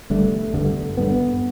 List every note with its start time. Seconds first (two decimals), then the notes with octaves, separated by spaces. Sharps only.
0.10 G1 G2 D3 A3
0.54 G1 G2 D3
0.97 G1 G2 D3 B3